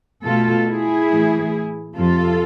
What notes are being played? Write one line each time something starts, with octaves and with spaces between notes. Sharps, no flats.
B2 A3 F4 A4
E4 G#4
A2 E3 A3
F2 C3 F3 F4 A4